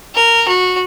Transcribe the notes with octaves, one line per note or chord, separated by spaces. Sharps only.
A#4
F#4